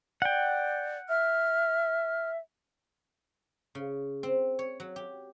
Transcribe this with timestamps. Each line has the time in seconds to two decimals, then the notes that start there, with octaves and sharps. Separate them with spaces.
0.22 D5 F#5 G5
1.09 E5 F6
3.75 C#3
4.23 C4
4.59 C#5
4.80 F#3
4.96 G4